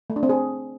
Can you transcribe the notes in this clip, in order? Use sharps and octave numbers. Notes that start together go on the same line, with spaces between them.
A3
D4
C4
G#4